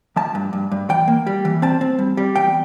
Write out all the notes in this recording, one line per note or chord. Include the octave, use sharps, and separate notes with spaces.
F3 A5
G2
G2
G2
E3 G5
A#3
G3
E3
C4 A5
C4
G3
G3
E2 G5